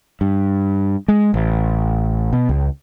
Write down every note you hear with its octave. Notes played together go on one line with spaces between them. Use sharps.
G2
G#3
A1
B2
C#2